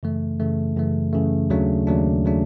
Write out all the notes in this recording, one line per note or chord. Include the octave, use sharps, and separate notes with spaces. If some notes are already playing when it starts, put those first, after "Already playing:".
F#2 C#3 E3 A3
F#2 C#3 E3 A3
F#2 C#3 E3 A3
F#2 C#3 E3 A3
D#2 C#3 F#3 A3 D4
D#2 C#3 F#3 A3 D4
C#3 F#3 A3 D4